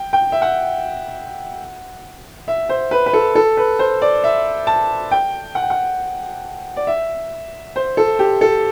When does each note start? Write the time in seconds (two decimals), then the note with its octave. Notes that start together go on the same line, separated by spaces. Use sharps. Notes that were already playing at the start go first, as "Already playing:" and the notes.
Already playing: G5
0.13 G5
0.32 E5
0.42 F#5
2.48 E5
2.69 C5
2.91 B4
3.06 B4
3.13 A4
3.35 A4
3.57 B4
3.79 C5
4.02 D5
4.24 E5
4.67 A5
5.11 G5
5.55 F#5
5.63 G5
5.70 F#5
6.76 D5
6.87 E5
7.76 C5
7.97 A4
8.19 G4
8.41 A4